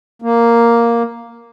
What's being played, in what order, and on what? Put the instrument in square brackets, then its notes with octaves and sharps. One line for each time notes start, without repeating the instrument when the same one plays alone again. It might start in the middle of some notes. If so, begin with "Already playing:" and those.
[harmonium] A#3